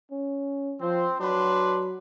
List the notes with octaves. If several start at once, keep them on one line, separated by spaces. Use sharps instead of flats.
C#4
F3 C4 C5
F#3 D4 B4 C6